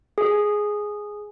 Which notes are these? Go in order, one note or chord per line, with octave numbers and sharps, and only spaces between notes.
G#4